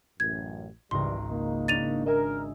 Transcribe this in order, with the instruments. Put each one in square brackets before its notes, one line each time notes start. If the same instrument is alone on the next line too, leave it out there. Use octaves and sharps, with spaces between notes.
[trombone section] A1 F#2 [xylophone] G#6
[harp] G#1 C#2 A#4 [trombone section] G#2 E3 G3 [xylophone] C6
[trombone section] A#3 D#4
[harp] C#4 D4 [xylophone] A6 D#7 F7
[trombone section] A#4 [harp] D#5 E5 G#5